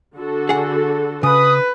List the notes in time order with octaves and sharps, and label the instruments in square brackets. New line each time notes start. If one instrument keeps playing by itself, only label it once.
[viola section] D3 F#4 A4
[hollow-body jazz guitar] G#4 F#5
[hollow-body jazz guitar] C#3 [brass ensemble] B4 [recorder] D#6